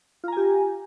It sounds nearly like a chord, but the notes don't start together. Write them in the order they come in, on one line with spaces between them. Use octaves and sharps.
F4 A#5 G#5 G4